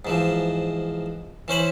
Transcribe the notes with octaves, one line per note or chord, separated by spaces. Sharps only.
G#2 E3 F3
E3 C#4 C5 B5